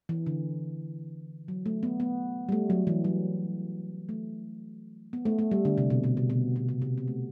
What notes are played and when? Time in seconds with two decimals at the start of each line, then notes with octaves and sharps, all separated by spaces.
0.09 E3
0.26 D3
1.48 F#3
1.66 A3
1.83 B3
2.00 B3
2.49 G3
2.52 A3
2.70 F#3
2.87 E3
3.04 F#3
4.09 A3
5.13 B3
5.25 A3
5.39 A3
5.51 G3
5.65 D3
5.78 C3
5.90 B2
6.04 B2
6.17 C3
6.30 B2
6.56 B2
6.69 C3
6.82 C3
6.98 B3
7.08 A3